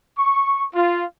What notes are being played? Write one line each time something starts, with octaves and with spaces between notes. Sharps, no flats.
C#6
F4